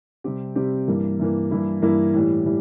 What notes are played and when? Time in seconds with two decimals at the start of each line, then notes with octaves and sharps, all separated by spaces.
0.24 C3 G3 C4 G4
0.56 C3 G3 C4 G4
0.87 G2 E3 A#3
1.20 G2 E3 A#3
1.51 G2 E3 A#3 E4
1.82 G2 E3 A#3 E4
2.14 A2 E3 G3
2.45 A2 E3 G3